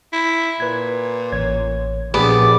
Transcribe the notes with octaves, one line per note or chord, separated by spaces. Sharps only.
E4
A#2 B4 G#6
A1 C#5 G#6
A#1 B3 G4 G#4 D5 B5